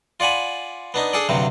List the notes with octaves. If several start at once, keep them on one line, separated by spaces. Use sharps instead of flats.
F4 D5 F#5 G#5 B5
B3 D4 D#4
D4 G#4 A4 D5
D2 G2 C3 F#3 G3